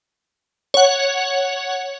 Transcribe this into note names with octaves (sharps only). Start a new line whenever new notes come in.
C#5 F#5